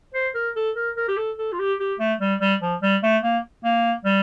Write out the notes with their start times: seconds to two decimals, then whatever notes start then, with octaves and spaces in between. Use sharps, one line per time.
0.14 C5
0.35 A#4
0.56 A4
0.76 A#4
0.97 A#4
1.08 G4
1.17 A4
1.38 A4
1.52 F4
1.59 G4
1.80 G4
1.99 A3
2.21 G3
2.40 G3
2.61 F3
2.82 G3
3.03 A3
3.23 A#3
3.64 A#3
4.05 G3